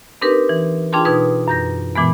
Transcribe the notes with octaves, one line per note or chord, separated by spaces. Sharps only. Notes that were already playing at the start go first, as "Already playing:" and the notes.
C4 D4 D#4 G4 A#4 B4
E3
D4 F4 G#4 G5 A5 C6
B2 D#4 B4 G#6
F#2 G6 A#6
A#2 E3 G#3 B3